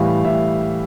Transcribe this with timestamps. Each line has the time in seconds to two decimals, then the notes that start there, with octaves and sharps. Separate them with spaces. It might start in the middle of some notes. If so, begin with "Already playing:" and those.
Already playing: A2 E3 G3 F5
0.24 A2 E5